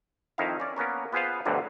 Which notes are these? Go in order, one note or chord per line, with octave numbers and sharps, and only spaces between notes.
F2 D#3 D#4 E4 E5 F5
C#4 D5
A#3 B3 C#4 A#4
B3 F4 G#4 B4 C5 F5
D2 G2 B2 D3 F#3 G3